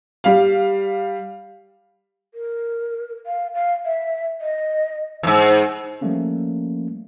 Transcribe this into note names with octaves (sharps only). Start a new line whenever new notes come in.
G3 F5
A#4
F5
F5
E5
D#5
E2 G#2
F3 G3 A3 A#3 C#4